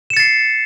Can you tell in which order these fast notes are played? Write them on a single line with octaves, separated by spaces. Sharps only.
E7 C#7 A6 C7